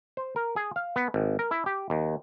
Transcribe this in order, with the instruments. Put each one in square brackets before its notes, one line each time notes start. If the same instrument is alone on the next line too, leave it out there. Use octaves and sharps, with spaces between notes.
[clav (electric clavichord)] C5
A#4
G#4
F5
B3
G#1
A#4
E4
G4
D#2